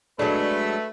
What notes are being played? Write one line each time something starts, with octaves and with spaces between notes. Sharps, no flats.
F#3 G#3 A3 D4 B4